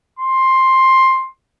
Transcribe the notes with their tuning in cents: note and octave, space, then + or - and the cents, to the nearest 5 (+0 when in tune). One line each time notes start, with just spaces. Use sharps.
C6 +10